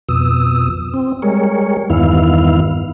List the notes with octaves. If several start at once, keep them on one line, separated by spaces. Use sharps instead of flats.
F2 B2 D#6 E6
C4
G3 G#3 A#4 C#5
E2 G2 D#3 B3 E4 F5